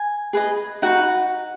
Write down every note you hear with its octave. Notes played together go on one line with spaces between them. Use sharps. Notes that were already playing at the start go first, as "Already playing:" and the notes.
Already playing: G#5
G#4 B4 D#5
D#4 F#4 B4 F#5